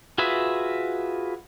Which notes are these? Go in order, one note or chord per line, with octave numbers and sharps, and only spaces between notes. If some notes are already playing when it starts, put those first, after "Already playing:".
F4 F#4 G#4 B4 E5